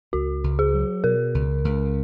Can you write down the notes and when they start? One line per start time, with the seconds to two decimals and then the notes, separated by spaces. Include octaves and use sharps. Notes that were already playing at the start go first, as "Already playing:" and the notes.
0.13 C#2 F#4
0.44 C#2
0.59 G#4
0.74 F#3
1.04 B2 A#4
1.35 C#2
1.64 C#2